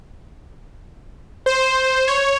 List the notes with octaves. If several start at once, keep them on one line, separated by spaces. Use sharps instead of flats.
C5
C#5